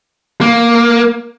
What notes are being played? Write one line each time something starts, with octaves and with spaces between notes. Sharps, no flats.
A#3